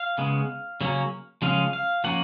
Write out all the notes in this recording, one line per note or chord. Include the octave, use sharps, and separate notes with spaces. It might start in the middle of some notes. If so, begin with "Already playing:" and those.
Already playing: F5
C#3 G#3 B3
C#3 F#3 A#3 C#4
C#3 F3 G#3 C#4 F5
F5
F3 A#3 C#4 F#5